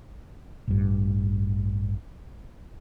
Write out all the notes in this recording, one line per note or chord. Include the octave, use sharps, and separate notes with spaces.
A1 G2